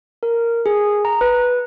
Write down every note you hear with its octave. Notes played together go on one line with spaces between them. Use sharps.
A#4
G#4
A#5
B4